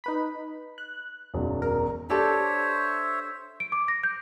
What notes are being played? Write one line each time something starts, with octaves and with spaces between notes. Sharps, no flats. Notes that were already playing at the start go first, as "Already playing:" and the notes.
D#4 B4 B5
F#6
E1 B1 F#2
A#4
D4 G4 A4 C5 C#5 E5
D7
D6
A#6
G6